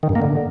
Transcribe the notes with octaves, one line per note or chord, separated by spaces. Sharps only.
D#3
G2
A#3
D3